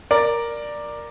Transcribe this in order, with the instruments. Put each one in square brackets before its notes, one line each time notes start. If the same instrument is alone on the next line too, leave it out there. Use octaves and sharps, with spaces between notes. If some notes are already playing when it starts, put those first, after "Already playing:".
[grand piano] A#4 D5